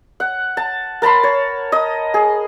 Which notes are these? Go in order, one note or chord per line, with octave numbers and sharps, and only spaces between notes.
F#5
A5
A#4 A5 B5 C6
C#5
D#5 D#6
G#4